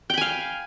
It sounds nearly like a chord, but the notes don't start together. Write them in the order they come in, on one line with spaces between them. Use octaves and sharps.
G5 B5 G#5 F5